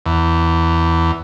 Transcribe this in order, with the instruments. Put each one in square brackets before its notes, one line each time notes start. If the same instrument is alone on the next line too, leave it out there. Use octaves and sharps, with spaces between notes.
[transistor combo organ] E2